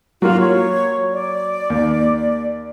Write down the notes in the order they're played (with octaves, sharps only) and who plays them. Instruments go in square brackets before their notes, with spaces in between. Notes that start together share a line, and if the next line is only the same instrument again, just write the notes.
[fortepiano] F#3 A#3 F#4 [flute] F4
[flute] C#5
D5
[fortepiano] D#2